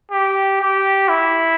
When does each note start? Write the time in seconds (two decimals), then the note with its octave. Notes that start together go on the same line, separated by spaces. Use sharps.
0.11 G4
0.60 G4
1.09 E4